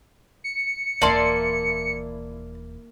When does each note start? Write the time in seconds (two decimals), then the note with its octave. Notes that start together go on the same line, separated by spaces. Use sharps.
0.44 C#7
1.02 D#1 E3 A#3 E4 D5 A5 C6